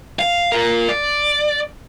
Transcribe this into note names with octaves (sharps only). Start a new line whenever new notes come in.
F5
F4 A#4
D5